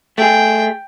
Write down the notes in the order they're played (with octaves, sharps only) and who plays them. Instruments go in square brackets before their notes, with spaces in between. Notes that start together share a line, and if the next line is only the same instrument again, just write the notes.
[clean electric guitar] A3 G#4 [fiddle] G5